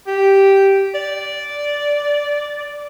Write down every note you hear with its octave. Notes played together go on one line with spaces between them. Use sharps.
G4
D5